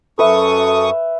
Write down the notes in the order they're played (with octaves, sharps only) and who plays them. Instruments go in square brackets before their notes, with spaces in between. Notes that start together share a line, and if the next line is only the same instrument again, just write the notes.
[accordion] F#2 C#6 D#6 [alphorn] A4 [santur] B4 E5